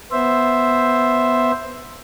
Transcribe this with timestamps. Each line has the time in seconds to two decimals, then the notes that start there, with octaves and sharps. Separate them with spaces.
0.12 B3 C5 E5